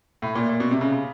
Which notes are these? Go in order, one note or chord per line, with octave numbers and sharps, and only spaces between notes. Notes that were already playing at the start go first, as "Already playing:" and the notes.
A2
A#2
A#2
B2
C3
C#3
C#3